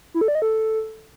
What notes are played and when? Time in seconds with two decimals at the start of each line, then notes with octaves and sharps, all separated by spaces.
0.14 E4
0.21 A4
0.28 D5
0.35 D#5
0.42 A4